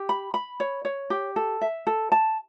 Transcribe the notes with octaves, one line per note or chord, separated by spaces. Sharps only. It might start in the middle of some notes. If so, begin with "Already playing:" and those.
Already playing: G4
B5
B5
C#5
C#5
G4
A4
E5
A4
A5